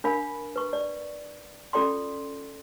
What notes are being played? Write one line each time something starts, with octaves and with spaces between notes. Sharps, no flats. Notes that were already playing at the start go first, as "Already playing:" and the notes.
D4 A#4 F5 B5
B4 C#6
D5
C#4 F4 A4 D5 G5 C6